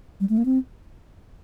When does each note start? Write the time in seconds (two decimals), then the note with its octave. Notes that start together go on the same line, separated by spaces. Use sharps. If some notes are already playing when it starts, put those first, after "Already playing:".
0.20 G3
0.29 A3
0.38 A#3
0.45 C4